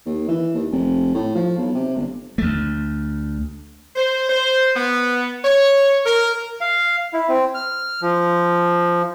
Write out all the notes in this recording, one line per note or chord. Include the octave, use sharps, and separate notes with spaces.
D#2
E3
D#2
F1
A2
F3
B1
C3
G1
D2 A3
C5
C5
B3
C#5
A#4
F5
E4
C4
F6
F3